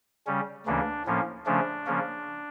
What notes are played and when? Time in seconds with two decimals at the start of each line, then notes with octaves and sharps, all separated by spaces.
0.26 C#3 G3 C#4
0.66 D2 C#3 E3 A#3 C#4 D4
1.06 A2 F3 A#3 C#4
1.46 C#3 F3 A3 C#4 D4
1.86 C#3 F3 A#3 C#4